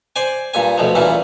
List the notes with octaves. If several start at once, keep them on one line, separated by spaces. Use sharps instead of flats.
C5 D5 G#5
G2 A#2 G#5
D2 B2 F3
G2 A#2 E3 C#4